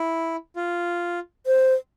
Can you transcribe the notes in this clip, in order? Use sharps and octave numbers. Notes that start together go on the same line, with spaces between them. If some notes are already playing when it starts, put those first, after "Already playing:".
Already playing: E4
F4
C5